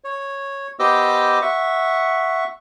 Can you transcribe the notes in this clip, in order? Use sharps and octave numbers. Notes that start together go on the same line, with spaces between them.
C#5
B3 G4 C5 D#5 D6 E6
E5 F#5 C#6